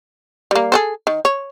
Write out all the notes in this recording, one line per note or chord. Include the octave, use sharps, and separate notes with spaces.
G3 A#3
G#4 A4 C5
D#3
C#5